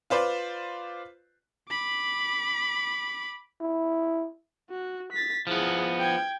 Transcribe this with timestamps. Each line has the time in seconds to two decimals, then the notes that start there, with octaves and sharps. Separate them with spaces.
0.10 F4 B4 C5 D5
1.69 B5 D6
3.61 E4
4.70 F#4
5.12 A6 B6
5.47 F3 B3 E4 G#4
5.99 G5 G#6